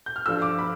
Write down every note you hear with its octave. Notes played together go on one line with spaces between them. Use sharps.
G6
F6
G2 F3 A3 E6
D6
B5